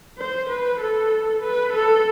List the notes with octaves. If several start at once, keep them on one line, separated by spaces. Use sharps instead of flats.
C5
B4
A4
B4
A4